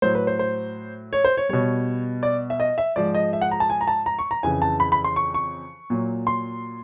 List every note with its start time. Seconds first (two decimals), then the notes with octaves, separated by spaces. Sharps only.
0.02 A2 F#3 C5
0.15 B4
0.27 C5
0.39 C5
1.13 C#5
1.25 C5
1.37 C#5
1.49 B2 G3 C#5
2.23 D5
2.50 E5
2.60 D#5
2.78 E5
2.96 G#2 F3 G#3 D5
3.15 D#5
3.33 E5
3.41 F#5
3.51 A#5
3.60 A5
3.70 G#5
3.81 A#5
3.88 A5
4.06 A#5
4.19 C#6
4.31 A#5
4.43 F2 C#3 E3 G#5
4.62 A5
4.80 B5
4.92 B5
5.04 C6
5.16 C#6
5.34 C#6
5.90 A#2 F#3
6.27 C6